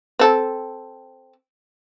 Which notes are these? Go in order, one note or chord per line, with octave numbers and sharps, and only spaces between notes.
C4 A4